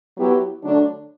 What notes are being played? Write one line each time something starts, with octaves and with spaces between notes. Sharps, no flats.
F#3 B3 E4 G4
D3 F#3 A3 D4